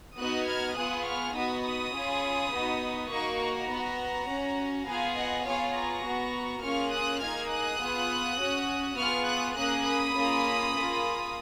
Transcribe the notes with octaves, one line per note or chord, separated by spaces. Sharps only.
B3 D#4 F#4 D#6 F#6
F6 G#6
B3 F4 G#4 D#6 F#6
C#6 F6
B3 D#4 F#4 B5 D#6
B5 D#6
C#4 F4 G#4
B3 D#4 F#4
A#3 D#4 F#4 A#5 C#6
F#5 A#5
B3 F#4
C#4 F#4
B3 F4 G#4 F5 G#5
D#5 F#5
B3 F4 G#4 C#5 F5
A#5 C#6
B3 F#4
A#3 C#4 F4 G#4 C#6 F6
D#6 F#6
A#3 D#4 G#4 F6 G#6
D#6 F#6
B3 F4 G#4
C#4 F#4
B3 F4 G#4 C#6 F6
D#6 F#6
A#3 C#4 G#4 D#6 F#6
B5 D#6
A#3 C#4 F4 G#4
A#3 F4 G#4